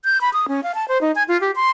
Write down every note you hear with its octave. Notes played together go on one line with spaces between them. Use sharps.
G6
B5
D#6
C#4
F5
A5
C5
D#4
G#5
F4
G4
C6